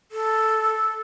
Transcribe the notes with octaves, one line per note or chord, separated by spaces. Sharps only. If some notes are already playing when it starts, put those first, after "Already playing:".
A4